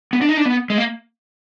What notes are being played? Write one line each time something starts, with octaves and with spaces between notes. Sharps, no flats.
B3
D4
D#4
D4
B3
G#3
A#3